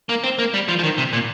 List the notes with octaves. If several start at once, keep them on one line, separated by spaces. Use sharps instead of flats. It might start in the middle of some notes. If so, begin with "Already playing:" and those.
A#3
C4
A#3
G3
F3
F3
D#3
C3
A#2